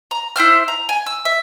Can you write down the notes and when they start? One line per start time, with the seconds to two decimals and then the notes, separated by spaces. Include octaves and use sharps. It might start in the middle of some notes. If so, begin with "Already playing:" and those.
0.11 A#5
0.36 E4 C5 E5 F6
0.68 A#5
0.89 G#5
1.06 E6
1.25 E5